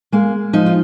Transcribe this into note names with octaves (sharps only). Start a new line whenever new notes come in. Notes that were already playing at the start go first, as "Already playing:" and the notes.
G#3 A#3
F3 D#4
F4